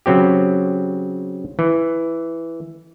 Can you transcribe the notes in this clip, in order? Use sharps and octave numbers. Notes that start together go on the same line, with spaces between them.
C#3 F#3 C4 G4
E3